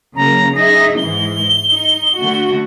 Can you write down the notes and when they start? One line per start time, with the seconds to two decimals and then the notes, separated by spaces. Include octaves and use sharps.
0.16 C#3 F#3 A#3 A#5
0.56 D#4 G#4 E5 A#6
0.98 G#2 E3 G#3 G7
1.70 D#4
2.18 D3 A3 F#4